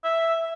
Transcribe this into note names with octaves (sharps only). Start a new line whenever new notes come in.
E5